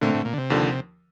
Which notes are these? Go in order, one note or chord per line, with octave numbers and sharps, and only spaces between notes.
A#2 D3 A3 C4
A2
A#2
D3
C3
D#2 D3 F3